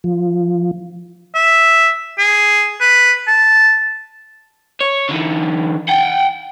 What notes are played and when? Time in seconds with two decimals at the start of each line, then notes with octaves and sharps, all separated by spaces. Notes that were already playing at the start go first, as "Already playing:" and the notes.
0.04 F3
1.35 E5
2.19 G#4
2.81 B4
3.28 A5
4.81 C#5
5.09 D3 E3
5.88 F#5 G5